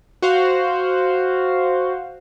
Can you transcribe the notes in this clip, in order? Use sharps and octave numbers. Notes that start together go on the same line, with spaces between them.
F#4 C5 F5